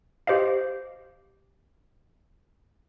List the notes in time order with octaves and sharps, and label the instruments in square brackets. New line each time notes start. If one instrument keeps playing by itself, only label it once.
[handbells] G4 C5 D#5 F5